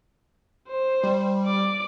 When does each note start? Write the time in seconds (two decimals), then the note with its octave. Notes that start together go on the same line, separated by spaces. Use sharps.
0.69 C5
1.03 G3
1.47 D5 D6